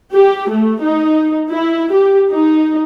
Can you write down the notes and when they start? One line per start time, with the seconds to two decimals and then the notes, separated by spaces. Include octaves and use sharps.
0.13 G4
0.50 A3
0.81 D#4
1.50 E4
1.93 G4
2.32 D#4